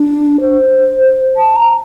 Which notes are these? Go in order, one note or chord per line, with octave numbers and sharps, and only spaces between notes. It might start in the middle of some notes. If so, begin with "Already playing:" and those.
Already playing: D4
C5
A5
A#5